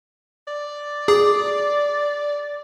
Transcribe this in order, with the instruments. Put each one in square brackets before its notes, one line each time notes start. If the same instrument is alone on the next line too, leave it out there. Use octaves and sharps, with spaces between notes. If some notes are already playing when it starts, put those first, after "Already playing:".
[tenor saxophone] D5
[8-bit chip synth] G#4 [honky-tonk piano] D6